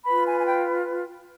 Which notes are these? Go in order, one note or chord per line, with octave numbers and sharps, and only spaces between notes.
F4 B4 B5
G#5
G#5
G5